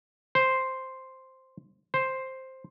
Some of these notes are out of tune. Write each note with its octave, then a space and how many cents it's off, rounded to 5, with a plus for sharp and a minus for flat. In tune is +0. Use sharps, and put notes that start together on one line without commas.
C5 +0
C5 +5